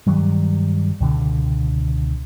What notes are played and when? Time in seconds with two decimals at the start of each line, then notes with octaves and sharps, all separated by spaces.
0.07 G2 D#3 F#3 G3
1.01 C#2 B2 D3